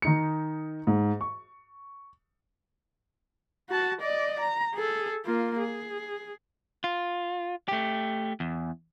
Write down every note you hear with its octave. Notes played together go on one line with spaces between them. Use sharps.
D#3 D#4 C#7
G#2
C#6
F#4 A5
D5 D#5
A#5
G#4 A4
A#3 F4
G#4
F4
A3 G4
E2